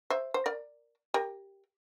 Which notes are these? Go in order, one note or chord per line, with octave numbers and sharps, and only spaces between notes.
C5 E5
C5
A#4 D5
G4 A#4